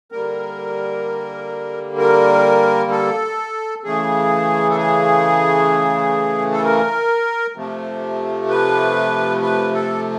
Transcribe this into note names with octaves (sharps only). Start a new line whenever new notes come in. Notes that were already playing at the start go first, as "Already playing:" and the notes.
D3 G3 A#3 A#4
A#4
A4
C#3 E3 A3 G#4
A4
G#4
A4
A#4
C3 F3 A3
B4
B4
A4